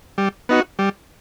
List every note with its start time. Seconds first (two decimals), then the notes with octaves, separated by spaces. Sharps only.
0.18 G3
0.49 B3 D#4 F#4
0.79 G3